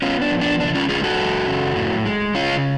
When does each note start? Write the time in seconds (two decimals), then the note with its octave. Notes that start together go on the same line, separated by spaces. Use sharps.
0.02 B3 C#4 F4
0.21 D4
0.31 F3
0.41 D4
0.60 C#3 D4
0.75 C#4 F4
0.89 G#3 F4 G#4
1.04 F#4 A4
1.18 F#2
1.48 C#3
1.76 A2
2.05 G#3
2.35 C#3 C#4 F4